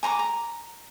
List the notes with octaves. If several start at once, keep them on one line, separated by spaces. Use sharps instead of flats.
G#5 A#5 C6 D6
A#5